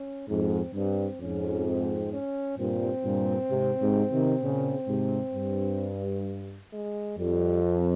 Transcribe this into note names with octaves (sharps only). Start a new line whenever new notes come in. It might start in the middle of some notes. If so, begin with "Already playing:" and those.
Already playing: C#4
F2 G#2 C4
G2 C4
F2 G#2 C#4
C4
C#4
G2 A#2 C4
G2 A#2
G#2 C3
G#2 C3
C3 D#3
A#2 C#3
G#2 C3
G2
G#3
F2 G3
F3